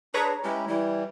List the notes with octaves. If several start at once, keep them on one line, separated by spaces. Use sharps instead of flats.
D4 G#4 B4 C#5 A#5
G#3 C#4 E4 G4
E3 G3 E4